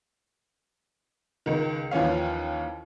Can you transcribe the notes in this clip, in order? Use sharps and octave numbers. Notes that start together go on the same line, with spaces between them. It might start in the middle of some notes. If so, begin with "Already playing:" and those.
C#2 D#3
D#2 E3 F3 C#4 F5